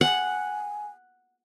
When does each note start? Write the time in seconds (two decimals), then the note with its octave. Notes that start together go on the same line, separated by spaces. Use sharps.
0.01 F#5 G#5